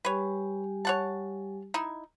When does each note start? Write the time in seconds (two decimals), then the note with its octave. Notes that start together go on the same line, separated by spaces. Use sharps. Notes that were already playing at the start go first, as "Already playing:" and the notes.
0.05 G3 G4 B4 C#5 G#5
0.85 C#5 F#5 A5
1.74 D#4 E4